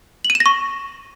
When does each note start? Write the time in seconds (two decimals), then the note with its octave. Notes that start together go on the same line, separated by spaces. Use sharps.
0.24 F#7
0.30 D#7
0.35 E7
0.40 A#6
0.46 C#6